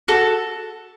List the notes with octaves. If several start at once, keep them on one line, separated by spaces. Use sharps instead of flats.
F#4 A4